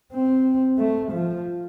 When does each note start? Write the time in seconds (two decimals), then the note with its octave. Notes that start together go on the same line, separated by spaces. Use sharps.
0.13 C4
0.78 A3
1.12 F3